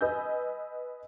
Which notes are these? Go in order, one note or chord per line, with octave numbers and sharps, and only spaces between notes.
B4 D#5 G#5 E6 G6